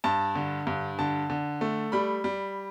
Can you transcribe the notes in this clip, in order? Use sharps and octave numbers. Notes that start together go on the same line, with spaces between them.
G2 A5
D3
G2
D3 A5
D3
A3
G3 B5
G3